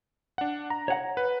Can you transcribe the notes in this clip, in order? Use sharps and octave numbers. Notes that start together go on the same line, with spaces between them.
D4 F#5
A#5
C#5 F#5
B4